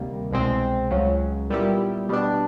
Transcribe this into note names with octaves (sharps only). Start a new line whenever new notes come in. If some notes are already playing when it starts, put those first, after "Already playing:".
Already playing: D2 C3 D#3 G3 A#3
C2 B2 G#3 C4
C#2 C#3 F#3
A#2 G3 B3 E4 G4
B2 G3 B3 D4